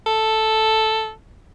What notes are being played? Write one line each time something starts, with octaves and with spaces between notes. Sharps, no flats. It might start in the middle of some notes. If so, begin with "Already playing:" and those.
A4